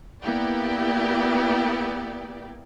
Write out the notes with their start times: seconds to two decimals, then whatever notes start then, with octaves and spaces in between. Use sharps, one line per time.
0.23 A#3 B3 E4 G4 D5